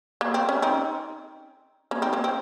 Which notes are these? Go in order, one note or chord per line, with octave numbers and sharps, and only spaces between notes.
A#3
C4
C#4
C4 D#4
A#3 C#4
C4 D#4
A#3 C#4
C4